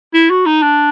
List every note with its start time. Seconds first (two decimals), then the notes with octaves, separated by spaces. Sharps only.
0.14 E4
0.30 F#4
0.46 D#4
0.62 D4